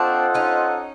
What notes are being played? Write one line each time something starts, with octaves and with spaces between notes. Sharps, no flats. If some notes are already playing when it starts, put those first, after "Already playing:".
Already playing: C4 D4 F4 A4 C5 D#5 F#5
C#4 D#4